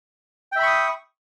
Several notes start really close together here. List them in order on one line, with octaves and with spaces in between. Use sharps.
G5 E5 B5 C#6 D#6